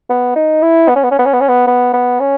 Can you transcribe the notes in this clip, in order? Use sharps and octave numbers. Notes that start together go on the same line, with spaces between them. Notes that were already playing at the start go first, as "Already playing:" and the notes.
B3
D#4
E4
B3
C#4
B3
C#4
B3
C#4
B3
C#4
B3
B3
B3
C#4